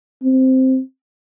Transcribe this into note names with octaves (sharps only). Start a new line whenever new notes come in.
C4